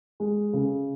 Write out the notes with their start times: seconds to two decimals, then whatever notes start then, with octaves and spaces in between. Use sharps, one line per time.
0.20 G#3
0.53 C#3